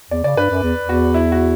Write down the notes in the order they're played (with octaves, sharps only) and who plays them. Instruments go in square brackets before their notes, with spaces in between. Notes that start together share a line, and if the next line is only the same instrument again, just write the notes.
[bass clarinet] E2 [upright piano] D5
[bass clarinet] C#3 [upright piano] D5
[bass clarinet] G2 [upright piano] B4
[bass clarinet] F#2
E2
[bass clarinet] E2 [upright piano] F#4
[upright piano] E4
F#4